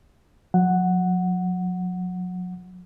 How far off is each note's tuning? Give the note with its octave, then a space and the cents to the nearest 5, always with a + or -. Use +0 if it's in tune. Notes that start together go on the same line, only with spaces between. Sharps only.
F#3 -40 F#5 +0